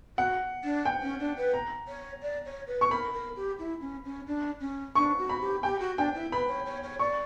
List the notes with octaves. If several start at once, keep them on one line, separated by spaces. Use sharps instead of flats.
F#4 F#5
D4
G5
C#4
D4
B4
A#5
C#5
D5
C#5
B4
C#6
A#4 B5
A#4
G4
E4
C#4
C#4
D4
C#4
D4 C#6
F#4
B5
G4
G4 G5
F#4
D4 G5
E4
B4 B5
C#5
C#5
C#5
D5 C#6